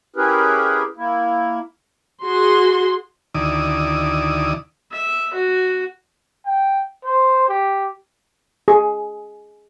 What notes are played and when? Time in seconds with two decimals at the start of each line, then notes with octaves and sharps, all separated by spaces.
0.16 C#4 E4 G4 G#4 A#4 B4
0.97 A#3 E4
2.23 F#4 G#4 C6
3.35 D2 D#3 E4 D5 D#6
4.92 E5
5.34 F#4
6.46 G5
7.05 C5
7.48 G4
8.68 G#4